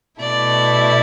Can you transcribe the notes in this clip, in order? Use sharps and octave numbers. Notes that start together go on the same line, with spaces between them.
B2 A3 E4 D5